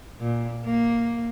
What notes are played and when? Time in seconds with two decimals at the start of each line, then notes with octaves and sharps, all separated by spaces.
0.20 A#2
0.65 A#3